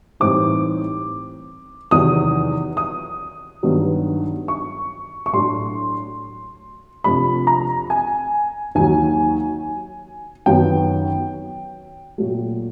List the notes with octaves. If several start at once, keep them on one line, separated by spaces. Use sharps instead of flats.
A2 E3 G3 C4 D#4 D6
E2 C3 D#3 F#3 D#6
D#6
G2 D#3 F#3 B3
C#6
C#6
A2 F#3 A3 D4 C6
F2 C3 F3 A3 D4 B5
A#5
G#5
D#2 D#3 F#3 G#5
F#2 D#3 F#3 B3 G5
A#2 F#3 A3